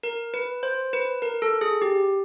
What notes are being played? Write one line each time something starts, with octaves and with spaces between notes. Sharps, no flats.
A#4
B4
C5
B4
A#4
A4
G#4
G4